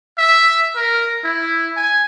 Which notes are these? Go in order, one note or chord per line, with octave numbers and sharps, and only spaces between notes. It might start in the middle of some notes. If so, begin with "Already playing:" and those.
E5
A#4
E4
G#5